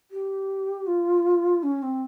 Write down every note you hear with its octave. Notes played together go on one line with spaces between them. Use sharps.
G4
F4
C#4
C4